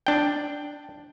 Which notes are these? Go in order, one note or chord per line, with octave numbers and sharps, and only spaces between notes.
D4 G5